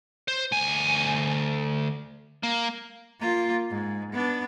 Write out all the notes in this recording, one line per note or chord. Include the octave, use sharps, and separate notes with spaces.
C5
D2 G#5
A#3
A#3 F4
G#2
B3 D4